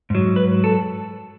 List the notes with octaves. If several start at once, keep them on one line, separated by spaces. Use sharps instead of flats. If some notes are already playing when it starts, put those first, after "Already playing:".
G#2 F#3
B4
A4